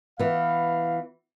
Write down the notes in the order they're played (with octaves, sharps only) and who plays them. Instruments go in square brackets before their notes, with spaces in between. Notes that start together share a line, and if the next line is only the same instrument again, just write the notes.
[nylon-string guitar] E3 B3 [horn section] F5